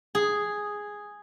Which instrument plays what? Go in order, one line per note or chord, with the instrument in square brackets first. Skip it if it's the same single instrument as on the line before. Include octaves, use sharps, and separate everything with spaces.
[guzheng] G#4